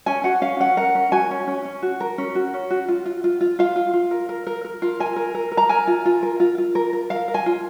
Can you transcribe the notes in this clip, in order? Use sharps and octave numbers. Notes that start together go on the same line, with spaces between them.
C#4 G#5
F#4 F#5
C#4 F5
C#4 F#5
A#4 F#5
C#4
F#4 G#5
C#4
C#4
C#4
F#4
A#4
C#4
F#4
C#4
F#4
F4
F4
F4
F4
F4 F5
F4
F4
A#4
A#4
A#4
A#4
F4
A#4 G#5
A#4
A#4
A#4
A#5
A#4 G#5
F4
F4
A#4
F4
F4
A#4
A#4
A#4 F5
A#4
G#5
F4